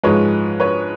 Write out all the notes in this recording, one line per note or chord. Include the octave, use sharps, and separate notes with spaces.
G#2 F3 G#3 B4 C#5
B4 C#5